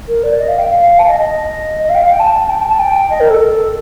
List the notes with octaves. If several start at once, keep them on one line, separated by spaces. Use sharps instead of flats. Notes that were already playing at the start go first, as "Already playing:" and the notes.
A#4
D5
D#5
F5
G5
F5
A5
D#5
D#5
D#5
F5
G5
F5
G5
A5
G5
A5
G5
D#5
A#4
A4
A4